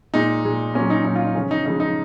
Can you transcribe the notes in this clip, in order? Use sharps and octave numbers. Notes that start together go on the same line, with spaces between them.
A#2 G#3 D#4
A#2 G#3
A#2 F#3 C#4
D#4
A#2 F#3 D#4
F4
D#4
C#3 F3 G#3 C#4
D#4
C#3 F3 G#3 D#4
D#4